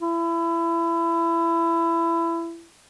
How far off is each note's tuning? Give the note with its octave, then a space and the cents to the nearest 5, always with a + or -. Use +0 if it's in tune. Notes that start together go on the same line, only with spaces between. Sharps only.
E4 +25